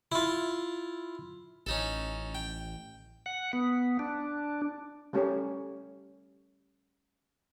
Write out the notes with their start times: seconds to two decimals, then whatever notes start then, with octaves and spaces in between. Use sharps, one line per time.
0.12 E4 F4
1.66 A1 C#4 D#4 A4
2.35 G5
3.26 F#5
3.53 B3
3.99 D4
5.13 G3 A3 C#4 G4 A#4 C#5